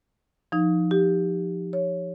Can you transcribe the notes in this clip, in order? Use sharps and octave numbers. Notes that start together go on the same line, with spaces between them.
F3 D#4
G4
C#5